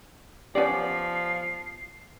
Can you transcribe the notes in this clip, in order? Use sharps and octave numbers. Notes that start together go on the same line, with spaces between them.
F3 B3 C#4 G4 D5 C7